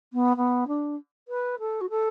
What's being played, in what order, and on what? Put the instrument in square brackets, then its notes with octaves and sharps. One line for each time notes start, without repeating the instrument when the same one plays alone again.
[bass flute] B3
B3
D4
B4
A4
F#4
A4